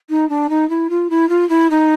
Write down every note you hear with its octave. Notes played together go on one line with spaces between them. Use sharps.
D#4
D4
D#4
E4
F4
E4
F4
E4
D#4